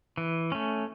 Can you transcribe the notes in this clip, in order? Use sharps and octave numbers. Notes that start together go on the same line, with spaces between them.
E3
A3 C#4